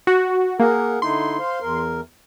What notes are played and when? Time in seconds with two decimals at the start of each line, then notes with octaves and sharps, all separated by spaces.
0.07 F#4
0.60 A#3 G#4 A#4 F#5
1.02 D3 D#4 E4 C6
1.39 C5 F5
1.61 E2 A#4